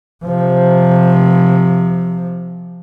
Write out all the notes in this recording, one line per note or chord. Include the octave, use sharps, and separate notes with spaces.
C3 F3